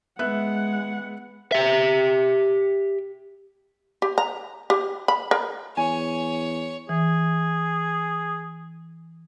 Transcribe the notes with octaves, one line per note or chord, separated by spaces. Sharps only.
G#3 B3 E5 F#5 F#6
G4 E5
G4
A#5
G4
B5
A#4
E2 C#5 G#5
E3 G#4